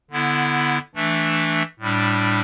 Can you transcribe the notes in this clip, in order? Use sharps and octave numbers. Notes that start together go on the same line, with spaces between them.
D3 B3 E4
E3 A3 D4
A2 G3 D4